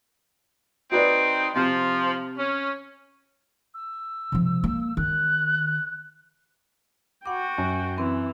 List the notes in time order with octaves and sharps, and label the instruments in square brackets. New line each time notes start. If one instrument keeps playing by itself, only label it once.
[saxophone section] C4 D#4 [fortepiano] F#4 B4 D5
[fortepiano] C3 F6 [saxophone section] F3
[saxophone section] C#4
[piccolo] E6
[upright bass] C3 F3
A#3
[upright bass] D#3 [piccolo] F#6
[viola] F#4 G5 [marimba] F#5 B5 D6
[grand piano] F#2
[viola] E3 [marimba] C4